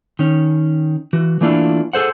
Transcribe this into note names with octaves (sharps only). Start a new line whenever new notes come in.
D#3 C#4
E3 F#4
E3 A3 A#3 D4 E4 F4
G#4 A4 C5 F#5